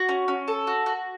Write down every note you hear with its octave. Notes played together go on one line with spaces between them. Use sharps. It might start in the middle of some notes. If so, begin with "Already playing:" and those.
Already playing: F#4
C#4
C#4
A4
F#4
F#4